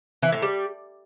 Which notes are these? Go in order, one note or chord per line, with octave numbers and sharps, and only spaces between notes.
E3
A2
G3